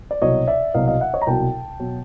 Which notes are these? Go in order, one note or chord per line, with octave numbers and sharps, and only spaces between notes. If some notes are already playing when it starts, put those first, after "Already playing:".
D5
C2 B2 F#3 C#5 D#5
D5 E5
C2 B2 F#3 D#5 F5
D#5 F5
E5 F#5
C#5 D#5
A#5
C2 B2 F#3 G5 A5
B2 F#3